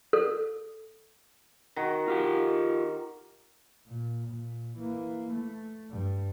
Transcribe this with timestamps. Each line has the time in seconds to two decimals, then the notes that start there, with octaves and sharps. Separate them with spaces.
0.13 A4
1.76 D#3 F#4
2.08 F4 G4 G5
3.87 A#2
4.27 A#2
4.76 E3 A#3
5.32 A3
5.90 G2